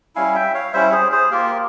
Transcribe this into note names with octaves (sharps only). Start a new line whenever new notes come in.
G3 C#4 E4 F5 G#5
E5 G5
C#5 F5
G3 C#4 E4 C5 E5
G#4 C5
G#4 C5
A#3 F4 G4 A#4